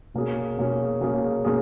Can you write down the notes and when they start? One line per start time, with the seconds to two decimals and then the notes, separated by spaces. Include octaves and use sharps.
0.14 B2 A#3 C#4 G#4
0.58 B2 A#3 C#4 G#4
1.01 B2 A#3 C#4 G#4
1.45 B2 A#3 C#4 G#4